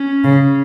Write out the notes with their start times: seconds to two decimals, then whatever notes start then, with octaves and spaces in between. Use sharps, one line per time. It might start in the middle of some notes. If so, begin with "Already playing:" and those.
Already playing: C#4
0.23 C#3